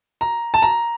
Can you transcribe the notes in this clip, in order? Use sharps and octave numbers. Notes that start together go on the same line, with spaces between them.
A#5
A5
A#5